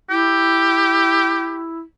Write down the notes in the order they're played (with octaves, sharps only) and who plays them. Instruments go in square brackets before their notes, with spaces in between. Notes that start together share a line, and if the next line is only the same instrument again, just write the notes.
[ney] E4 [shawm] G4